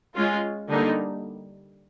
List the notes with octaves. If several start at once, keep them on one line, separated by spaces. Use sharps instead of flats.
G#3 C#4 F4
D3 G3 A#3 D#4